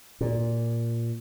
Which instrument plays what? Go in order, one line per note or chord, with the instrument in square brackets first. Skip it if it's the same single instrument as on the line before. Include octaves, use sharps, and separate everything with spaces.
[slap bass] A#2